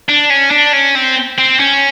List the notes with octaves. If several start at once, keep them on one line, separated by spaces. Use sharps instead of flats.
D4
C#4
D4
C#4
C4
C4
C#4